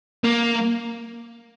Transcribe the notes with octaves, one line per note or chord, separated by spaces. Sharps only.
A#3